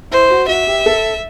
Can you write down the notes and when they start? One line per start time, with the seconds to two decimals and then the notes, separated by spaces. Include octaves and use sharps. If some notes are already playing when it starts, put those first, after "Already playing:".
0.11 E4 C5
0.30 F#4
0.48 F#4 E5
0.67 G4
0.86 A4